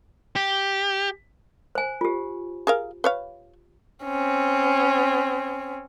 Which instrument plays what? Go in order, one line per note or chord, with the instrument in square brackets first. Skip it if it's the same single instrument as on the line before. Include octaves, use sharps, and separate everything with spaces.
[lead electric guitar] G4
[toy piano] C5 G#5
F4 G4
[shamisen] G#4 A#4 F5
B4 C#5 F5
[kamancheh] C4 C#4